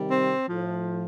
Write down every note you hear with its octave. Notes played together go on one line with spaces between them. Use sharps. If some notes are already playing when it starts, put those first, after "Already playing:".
Already playing: C3 D#3 G3
C4
A2 F3